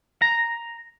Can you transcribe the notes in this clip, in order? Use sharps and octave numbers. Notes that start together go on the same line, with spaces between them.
A#5